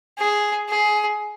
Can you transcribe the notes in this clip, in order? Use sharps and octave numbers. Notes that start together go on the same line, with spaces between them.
G#4
G#4